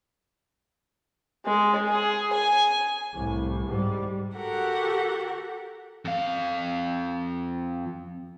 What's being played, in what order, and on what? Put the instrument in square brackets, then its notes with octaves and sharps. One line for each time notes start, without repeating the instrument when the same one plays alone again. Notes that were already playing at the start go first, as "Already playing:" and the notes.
[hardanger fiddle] G#3
G#4
G#5
[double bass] C2 A2
G#2 G3
[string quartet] F#4 G4 A4 A#4 F#5
[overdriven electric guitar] F2 F5